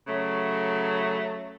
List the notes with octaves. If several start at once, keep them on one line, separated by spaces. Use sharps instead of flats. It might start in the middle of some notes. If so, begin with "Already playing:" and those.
C#3 F#3 A3